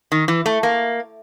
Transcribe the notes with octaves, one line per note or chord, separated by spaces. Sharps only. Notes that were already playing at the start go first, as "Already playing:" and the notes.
D#3
E3
A3
A#3